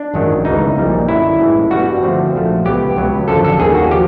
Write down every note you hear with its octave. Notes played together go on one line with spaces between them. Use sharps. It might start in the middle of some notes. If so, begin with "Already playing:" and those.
Already playing: D4
G#1 F#2 D#3 F#3
C#2 C#3 E3 A3 D#4
A#1 A#2 G3
F#2 D3 F#3 E4
A2 E3 G#3 C#4
G2 E3 G3 B3 F#4
G2 D3 F3 A3 C4
A#1 G#2 F3 A3
C#2 B2 F#3 B3 G4
C#2 B2 F#3
G#1 F#2 D3 F3 A4
A4
D#2 D#3 G3 A#3 G#4
F#4
F3 G4